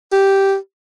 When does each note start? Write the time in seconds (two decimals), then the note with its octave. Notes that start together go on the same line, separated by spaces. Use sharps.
0.12 G4